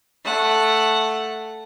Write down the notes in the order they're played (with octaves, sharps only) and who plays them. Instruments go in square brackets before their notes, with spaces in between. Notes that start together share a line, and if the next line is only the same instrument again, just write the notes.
[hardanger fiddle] A3 F#5